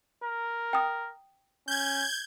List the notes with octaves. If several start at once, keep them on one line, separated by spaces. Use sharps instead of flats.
A#4
G5 D#6
C#4 G6 G#6